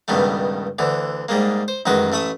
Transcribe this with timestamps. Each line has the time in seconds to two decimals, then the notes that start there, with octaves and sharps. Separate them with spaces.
0.08 C#2 G2 B2 D#3 G3 A3
0.79 D2 D3 E3
1.29 G#2 G3 G#3 A#3
1.68 C5
1.86 A1 F#2 D#3 G#3 F#4 B4
2.12 A1 A3 E5 B5 D#6